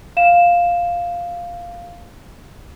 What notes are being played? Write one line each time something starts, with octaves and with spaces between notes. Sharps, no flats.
F5 E7